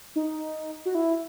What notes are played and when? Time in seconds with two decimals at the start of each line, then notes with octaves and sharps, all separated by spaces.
0.16 D#4
0.85 F#4
0.95 E4